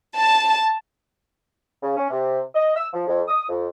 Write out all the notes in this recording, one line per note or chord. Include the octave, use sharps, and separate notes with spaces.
A5
C#3
C#4
C3
D#5
E6
F3
F2
D#6
F2